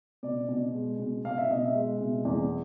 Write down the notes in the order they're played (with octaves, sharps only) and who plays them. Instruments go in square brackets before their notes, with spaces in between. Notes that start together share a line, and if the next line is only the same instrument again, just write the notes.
[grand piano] B2 D5
B2
G#3
B2
B2 F5
E5
B2 D#5
E5
G#3
B2
E2